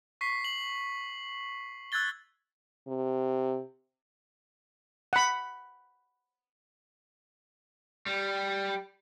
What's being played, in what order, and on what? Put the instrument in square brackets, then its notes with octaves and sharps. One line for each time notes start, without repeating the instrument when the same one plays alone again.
[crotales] C#6 B6 C7
F#7
E6 F#6 G#6 A6 G7
[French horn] C3
[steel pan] F#5 B5
[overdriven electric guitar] G3